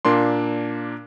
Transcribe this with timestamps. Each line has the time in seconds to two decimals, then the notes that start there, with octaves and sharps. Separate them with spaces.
0.05 A#2 A#3 D4 C6